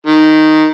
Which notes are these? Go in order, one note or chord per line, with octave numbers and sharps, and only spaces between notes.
D#3